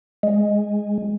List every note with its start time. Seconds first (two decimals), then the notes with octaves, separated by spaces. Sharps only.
0.23 G#3